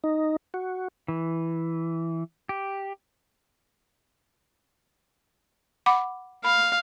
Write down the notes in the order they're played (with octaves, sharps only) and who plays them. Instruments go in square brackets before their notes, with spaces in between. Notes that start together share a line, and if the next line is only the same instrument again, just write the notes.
[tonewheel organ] D#4
F#4
[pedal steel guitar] E3
G4
[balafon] F#5 B5 D6
[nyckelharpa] F5 [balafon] B5